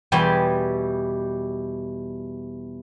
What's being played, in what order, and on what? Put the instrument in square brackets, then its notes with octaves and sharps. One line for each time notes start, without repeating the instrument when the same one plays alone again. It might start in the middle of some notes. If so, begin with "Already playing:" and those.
[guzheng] E2 B2 G3 G4 G#5 C6